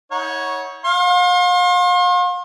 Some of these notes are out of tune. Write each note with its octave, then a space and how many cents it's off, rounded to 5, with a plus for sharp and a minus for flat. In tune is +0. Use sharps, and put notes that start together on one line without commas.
D#4 +45 C#5 +0 F#5 -10
F5 +40 C6 +40